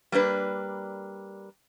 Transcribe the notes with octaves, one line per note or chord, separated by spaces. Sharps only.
G3 A#3 D4 B4